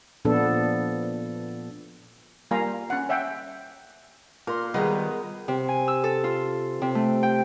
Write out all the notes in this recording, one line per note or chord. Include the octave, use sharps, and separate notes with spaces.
A#2 F3 B3 D4 A4
G3 A#3 F4 F5 G#5 A#5
C#4 F#5
C#5 E5 F#5 G5
A#2 A#4 C6
D#3 G3 G#3 B3 A#4 B4 D#5
C3
G#5
E6
A4
F4
C3
A3
G5